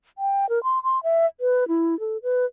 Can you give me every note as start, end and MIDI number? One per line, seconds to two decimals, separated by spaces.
0.18 0.49 79
0.49 0.62 70
0.64 0.82 84
0.83 1.02 84
1.03 1.26 76
1.41 1.64 71
1.68 1.98 64
2.00 2.17 69
2.23 2.45 71